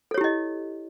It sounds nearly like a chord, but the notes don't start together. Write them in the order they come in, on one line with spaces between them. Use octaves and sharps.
A4 C#5 G4 E4 D#5